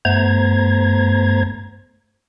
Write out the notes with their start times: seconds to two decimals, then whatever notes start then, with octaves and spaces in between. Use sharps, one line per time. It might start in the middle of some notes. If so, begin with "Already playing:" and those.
0.05 G2 A3 B3 C5 A#5 G#6